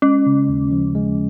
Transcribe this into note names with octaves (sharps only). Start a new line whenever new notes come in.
G#3 C#4
C#3
D#2
F3
G#3